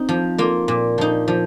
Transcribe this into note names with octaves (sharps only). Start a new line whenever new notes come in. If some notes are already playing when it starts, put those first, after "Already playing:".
Already playing: C4 D#4
F3
A#3 F4
A#2
F3 D#4
F3